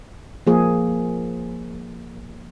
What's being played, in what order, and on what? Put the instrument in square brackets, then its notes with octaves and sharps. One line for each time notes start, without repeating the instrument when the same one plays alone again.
[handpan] F3 A#3 G#4